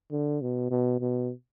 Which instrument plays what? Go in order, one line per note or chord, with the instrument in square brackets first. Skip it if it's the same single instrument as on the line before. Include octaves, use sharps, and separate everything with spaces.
[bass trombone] D3
B2
B2
B2